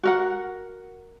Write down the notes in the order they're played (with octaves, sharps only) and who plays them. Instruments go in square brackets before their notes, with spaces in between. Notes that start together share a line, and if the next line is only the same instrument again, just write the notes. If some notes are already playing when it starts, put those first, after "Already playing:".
[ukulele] F#4 A#4 F#5